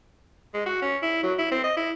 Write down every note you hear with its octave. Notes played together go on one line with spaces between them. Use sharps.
G#3
F#4
C#4
E4
F#3
E4
C4
D#5
E4